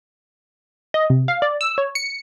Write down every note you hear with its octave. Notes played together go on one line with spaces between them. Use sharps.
D#5
C3
F5
D5
E6
C#5
C#7